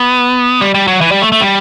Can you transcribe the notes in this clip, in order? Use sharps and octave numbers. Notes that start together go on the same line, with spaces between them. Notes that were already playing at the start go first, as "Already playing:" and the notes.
Already playing: B3
G3
G3
F#3
E3
G3
A3
A3
G3